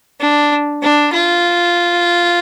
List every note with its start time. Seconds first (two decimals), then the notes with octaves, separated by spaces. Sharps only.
0.21 D4
0.83 D4
1.13 F4